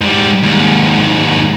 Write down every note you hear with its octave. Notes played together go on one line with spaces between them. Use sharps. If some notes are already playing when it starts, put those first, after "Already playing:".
G#2 G3
D#2 G#2